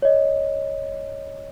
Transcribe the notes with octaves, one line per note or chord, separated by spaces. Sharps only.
C#5 D#5